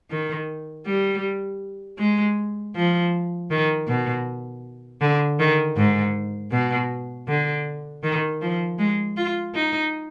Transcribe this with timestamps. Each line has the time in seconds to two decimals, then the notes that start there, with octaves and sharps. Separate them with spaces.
0.10 D#3
0.86 G3
1.99 G#3
2.75 F3
3.51 D#3
3.88 B2
5.01 D3
5.39 D#3
5.77 G#2
6.52 B2
7.28 D3
8.03 D#3
8.42 F3
8.79 G#3
9.17 F4
9.55 D#4